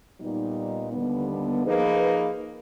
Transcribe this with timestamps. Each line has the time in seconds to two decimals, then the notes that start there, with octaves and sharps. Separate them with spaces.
0.19 A#2 G3 B3 D#4
0.91 D#2 D3 G3 B3
1.63 F3 A#3 D#4 G#4 B4